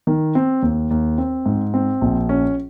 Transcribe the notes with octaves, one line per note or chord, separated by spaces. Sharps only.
D#3
C4
D#2
D#2
C4
G#2
C4
A#1
C#4